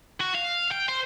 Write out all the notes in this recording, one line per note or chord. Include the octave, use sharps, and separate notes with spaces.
F#4
F5
G5
C5